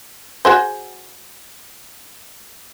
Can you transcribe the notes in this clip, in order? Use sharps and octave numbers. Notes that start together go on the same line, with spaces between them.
F#4 G#4 C5